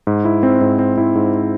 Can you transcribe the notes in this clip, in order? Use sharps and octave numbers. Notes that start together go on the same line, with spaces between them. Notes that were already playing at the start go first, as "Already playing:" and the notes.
G#2
E4
C4
G#2
C4
E4
G#2